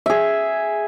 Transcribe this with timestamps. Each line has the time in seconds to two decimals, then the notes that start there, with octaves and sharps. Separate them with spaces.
0.06 G#4 E5